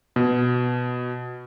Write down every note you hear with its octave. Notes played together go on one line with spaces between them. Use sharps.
B2